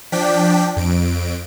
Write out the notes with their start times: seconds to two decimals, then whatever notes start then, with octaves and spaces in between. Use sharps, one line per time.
0.12 F3 D4 G5 B6
0.76 F2 D7